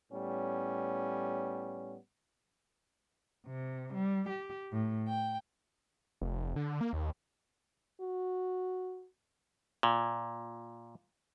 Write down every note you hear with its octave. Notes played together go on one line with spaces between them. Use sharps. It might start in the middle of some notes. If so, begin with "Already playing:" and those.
A2 G3 B3 C#4
C3
G3
G4
A2
G5
F1
D3
A#3
D#2
F#4
A#2